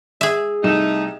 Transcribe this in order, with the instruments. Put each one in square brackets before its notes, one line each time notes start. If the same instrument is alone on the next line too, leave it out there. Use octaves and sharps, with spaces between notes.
[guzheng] G#4 E5
[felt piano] C2 E7 [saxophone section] A3 D#4